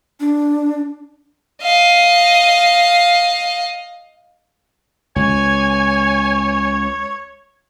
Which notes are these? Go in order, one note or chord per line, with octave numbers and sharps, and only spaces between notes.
D4
D#5 F5
C#2 C#5 G#5